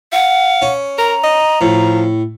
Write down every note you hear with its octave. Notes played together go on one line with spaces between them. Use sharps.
F5 F#5
C#4
A#4 A#5
D#5
A2 F3